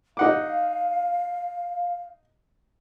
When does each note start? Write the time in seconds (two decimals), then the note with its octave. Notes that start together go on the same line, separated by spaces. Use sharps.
0.17 D#4 F5 F#5 D6